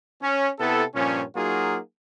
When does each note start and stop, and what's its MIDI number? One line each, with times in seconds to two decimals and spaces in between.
0.22 0.50 61
0.59 0.83 48
0.59 0.83 59
0.59 0.83 64
0.59 0.83 69
0.95 1.23 43
0.95 1.23 46
0.95 1.23 53
0.95 1.23 61
1.36 1.78 54
1.36 1.78 58
1.36 1.78 63
1.36 1.78 65
1.36 1.78 66
1.36 1.78 68